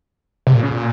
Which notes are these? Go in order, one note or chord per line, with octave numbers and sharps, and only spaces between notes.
C3
A#2
C#3
A#2